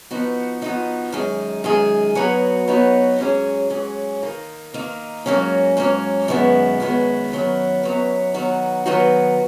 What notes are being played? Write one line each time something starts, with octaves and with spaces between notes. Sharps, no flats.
F3 B3 D#4 F#4
F3 B3 D#4 F#4
F#2 D#3 G#3 D#4 G#4
F#2 D#3 G#3 D#4 G#4
F#3 B3 D#4 F#4 C#5
F#3 B3 D#4 F#4 C#5
G#2 F#3 C#4 G#4
G#2 F#3 C#4 G#4
D#3 A#3 D#4
D#3 A#3 D#4
G#2 F#3 A#3 C#4
G#2 F#3 A#3 C#4
F#2 D#3 G#3 B3 F#4
F#2 D#3 G#3 B3 F#4
F#2 D#3 F#3 B3
F#2 D#3 F#3 B3
D#3 F#3 B3 D#4 F#4
D#3 F#3 B3 D#4 F#4